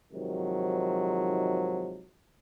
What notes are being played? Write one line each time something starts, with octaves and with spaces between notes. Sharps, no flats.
G#2 C3 D#3 F3 F#3